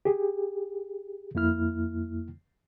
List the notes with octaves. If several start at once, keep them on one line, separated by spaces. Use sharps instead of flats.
G4 G#4
F2 A#3 E4 F6